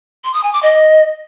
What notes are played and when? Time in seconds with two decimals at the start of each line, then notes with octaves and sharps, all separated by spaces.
0.24 C6
0.34 D#6
0.43 G#5
0.53 D6
0.63 D#5